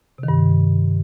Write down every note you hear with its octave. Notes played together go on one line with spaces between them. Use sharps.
C3
D#3
G2